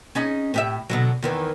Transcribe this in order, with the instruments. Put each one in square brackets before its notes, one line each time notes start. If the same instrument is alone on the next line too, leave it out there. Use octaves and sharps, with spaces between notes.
[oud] C#4 D#4 G#4
A2 G4 E5
B2 D3 F#3
E2 D#3 E3